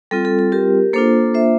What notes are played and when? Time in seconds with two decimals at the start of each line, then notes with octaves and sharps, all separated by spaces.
0.11 G3 C4 F4 A4
0.25 A4
0.39 A4
0.52 G4 A#4
0.93 A#3 D4 F4 A4 C5
1.34 C5 E5